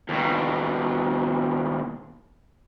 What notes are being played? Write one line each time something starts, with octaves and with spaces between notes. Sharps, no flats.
D#2 B2